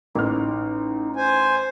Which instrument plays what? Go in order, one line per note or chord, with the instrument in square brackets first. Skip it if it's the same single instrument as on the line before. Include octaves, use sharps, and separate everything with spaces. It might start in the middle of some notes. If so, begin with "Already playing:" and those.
[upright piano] A1 F6 [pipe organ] D#4
[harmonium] C5 G#5